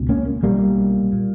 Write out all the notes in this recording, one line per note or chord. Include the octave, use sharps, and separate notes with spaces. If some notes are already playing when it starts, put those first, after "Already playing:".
Already playing: C#2 B2
A#3 C#4
B1 A#2 G3 A#3
A#2